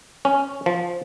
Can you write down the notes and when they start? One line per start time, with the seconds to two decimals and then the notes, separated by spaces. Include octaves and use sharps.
0.25 C#4
0.66 F3